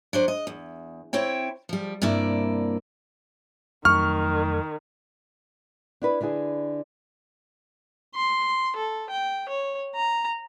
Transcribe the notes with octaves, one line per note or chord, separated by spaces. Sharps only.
F#3 D4 C5
D#5
E2
C4 E4 C#5 G5
F3 G3
G2 C3 A#3 E4 D5
F2 D#3 F#3 A3 C#6 F6
D4 E4 B4
D3 D4 E4 G#4
C6
A4
G5
C#5
A#5